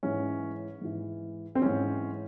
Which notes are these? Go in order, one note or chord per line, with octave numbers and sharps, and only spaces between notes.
G#2 E3 C#4
G#2 E3
C4
G#2 E3 C#4